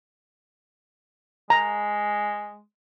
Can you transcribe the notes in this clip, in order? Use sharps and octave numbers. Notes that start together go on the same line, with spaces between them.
G#3 A#5